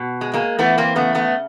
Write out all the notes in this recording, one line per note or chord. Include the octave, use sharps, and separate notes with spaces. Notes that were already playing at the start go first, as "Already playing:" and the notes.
Already playing: B2
G#3
G#3 A#3
E3 A3 B3
A#3 C4
C#3 A3 B3
A3 B3